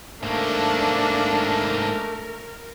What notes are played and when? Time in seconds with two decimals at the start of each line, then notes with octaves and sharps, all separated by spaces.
0.23 G#2 A3 A#3 D4 A#4